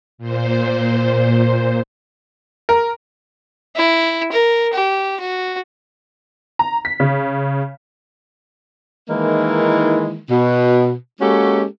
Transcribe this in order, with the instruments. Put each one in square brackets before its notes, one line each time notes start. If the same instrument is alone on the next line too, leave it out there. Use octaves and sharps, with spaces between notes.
[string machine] A#2 C5
[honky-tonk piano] A#4
[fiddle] E4
A#4
G4
F#4
[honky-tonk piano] A#5
B6
C#3
[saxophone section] D#3 E3 G#3 A#3 D#4 E4
B2
G#3 A#3 C#4 F#4 G4 A4